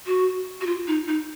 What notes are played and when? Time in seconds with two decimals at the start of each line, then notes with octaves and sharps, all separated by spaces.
0.07 F#4
0.61 F#4
0.66 F4
0.87 D#4
1.08 D#4